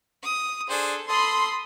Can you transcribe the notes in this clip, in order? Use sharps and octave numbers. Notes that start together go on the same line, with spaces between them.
D#6
D4 G#4 A4 C5
A4 B5 C6 D#6